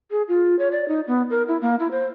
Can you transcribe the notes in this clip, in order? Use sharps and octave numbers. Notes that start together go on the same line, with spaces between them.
G#4
F4
C#5
D5
D#4
B3
A#4
E4
A#3
E4
C5